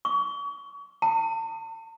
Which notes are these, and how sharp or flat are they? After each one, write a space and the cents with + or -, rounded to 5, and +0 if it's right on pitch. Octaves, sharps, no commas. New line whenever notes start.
C#6 +40
A5 +45